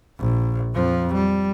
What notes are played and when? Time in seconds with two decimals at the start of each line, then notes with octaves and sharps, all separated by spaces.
0.19 A#1
0.75 F2 F3
1.14 G3